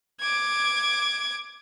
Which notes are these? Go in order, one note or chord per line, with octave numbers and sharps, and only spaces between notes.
D6 G#6